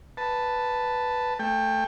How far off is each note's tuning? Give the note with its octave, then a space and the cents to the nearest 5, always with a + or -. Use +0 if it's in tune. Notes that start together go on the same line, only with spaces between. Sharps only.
B4 +0 A5 +0
A3 +0 G5 +25